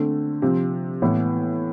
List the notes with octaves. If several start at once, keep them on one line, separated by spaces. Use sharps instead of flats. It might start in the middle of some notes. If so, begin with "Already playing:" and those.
Already playing: D3 A3 C4
C3 F3 C4
A2 E3 B3